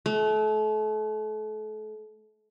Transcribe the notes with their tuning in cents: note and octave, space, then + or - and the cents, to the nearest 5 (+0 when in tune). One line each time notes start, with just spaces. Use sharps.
A3 -35